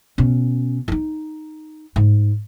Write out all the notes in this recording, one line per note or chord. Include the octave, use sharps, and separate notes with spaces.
B2 C#4
D#4 F4
G#2